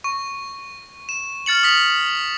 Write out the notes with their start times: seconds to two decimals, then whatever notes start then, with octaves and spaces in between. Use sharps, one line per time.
0.04 C#6
1.09 E7
1.46 F6 A6 C#7 F#7
1.63 D#6 B6 F#7